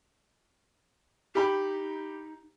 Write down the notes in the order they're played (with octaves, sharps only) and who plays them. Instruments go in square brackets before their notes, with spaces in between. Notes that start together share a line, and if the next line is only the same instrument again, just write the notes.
[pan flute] D#4 [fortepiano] G4 B5